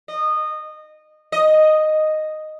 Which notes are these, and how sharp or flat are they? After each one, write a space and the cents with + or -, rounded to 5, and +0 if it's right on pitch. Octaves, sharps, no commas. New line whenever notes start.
D#5 -20
D#5 -5